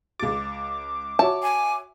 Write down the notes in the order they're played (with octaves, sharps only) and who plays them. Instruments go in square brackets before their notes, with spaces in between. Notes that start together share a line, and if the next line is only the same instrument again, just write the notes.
[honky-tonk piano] C#2 A6 [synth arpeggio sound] D6
[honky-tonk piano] F#4 C#5 E5 [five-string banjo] A5
[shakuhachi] G#5